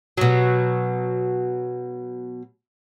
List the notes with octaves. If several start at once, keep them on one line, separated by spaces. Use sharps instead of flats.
B2 F#3